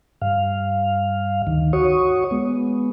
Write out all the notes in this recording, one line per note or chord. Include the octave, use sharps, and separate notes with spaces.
G2 F5
D2 D#3
F#4 C#5 C#6 D#6
G#3 B3